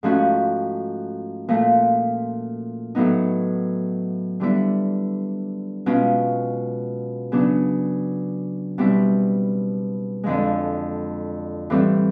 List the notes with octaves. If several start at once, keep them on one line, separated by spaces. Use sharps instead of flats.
G#2 F3 A3 C#4 F#4
A#2 F3 A3
A2 F#3 B3 D#4
D3 G3 B3 E4
B2 G#3 C#4 F4
C#3 F#3 B3 D4
B2 G3 C4 E4
F2 D3 F3 G#3
A2 E3 G3 C4